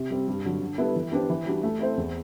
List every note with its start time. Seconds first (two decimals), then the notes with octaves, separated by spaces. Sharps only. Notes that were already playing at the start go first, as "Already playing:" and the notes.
Already playing: C3
0.10 G3 C4
0.27 G2
0.45 D3 F#3
0.61 D3
0.78 G3 B3 E4 A4
0.96 E3
1.12 B3 D4 G4 C5
1.29 E3
1.46 G3 D4 F#4
1.63 A3
1.80 C4 E4 A4 C5
1.97 E2